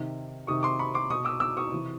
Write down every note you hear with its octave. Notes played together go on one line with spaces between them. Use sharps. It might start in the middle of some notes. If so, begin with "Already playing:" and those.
Already playing: C3 D#3
C3 D#3 C#6 D#6
C6 D6
B5 C#6
C6 D6
B2 C#6 D#6
D6 E6
D6 E6
C#6 D#6
C3 E3